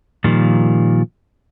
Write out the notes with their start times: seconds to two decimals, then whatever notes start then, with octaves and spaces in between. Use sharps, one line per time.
0.24 A#2 D#3 F3 G3